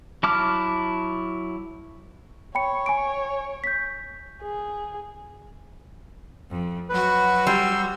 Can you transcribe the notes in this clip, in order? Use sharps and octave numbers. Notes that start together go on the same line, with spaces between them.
F#3 E4 A5 D6 F6
C#5 G5 B5 C#7
G#5 C#6 D7
G6 B6
G#4
F2
F#3 F#4 B4
G3 C6 E6